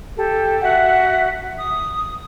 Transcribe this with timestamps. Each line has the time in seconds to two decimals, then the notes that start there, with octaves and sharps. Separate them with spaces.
0.17 G4 A4
0.63 F#4 E5 F#5
1.58 D#6